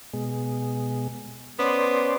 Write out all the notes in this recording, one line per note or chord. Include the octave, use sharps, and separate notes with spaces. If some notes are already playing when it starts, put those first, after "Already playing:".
B2 G#3
B3 C#4 C5 D5